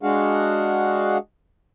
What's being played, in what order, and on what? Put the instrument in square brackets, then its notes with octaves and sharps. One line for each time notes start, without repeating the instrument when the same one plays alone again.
[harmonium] G#3 D4 F#4 G#4 F5 F#5